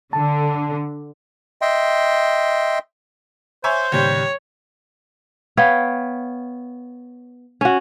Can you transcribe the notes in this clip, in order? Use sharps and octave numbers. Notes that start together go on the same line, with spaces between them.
D3 A5
D#5 E5 G5 C6
C5 C#5 E5 G#5
D#2 A2 C#3 G3 C#5 G6
B3 C#5 F5 G5
C#4 F#4